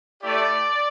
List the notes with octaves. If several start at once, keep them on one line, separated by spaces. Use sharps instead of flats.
A3 E4 G4 D5